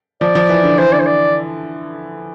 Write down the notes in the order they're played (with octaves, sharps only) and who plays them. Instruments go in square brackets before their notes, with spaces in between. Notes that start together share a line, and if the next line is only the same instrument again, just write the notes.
[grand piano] F3 [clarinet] D5
[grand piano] F3
E3
D3
[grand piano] E3 [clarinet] C5
[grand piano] D3 [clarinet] D5
[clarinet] C5
D5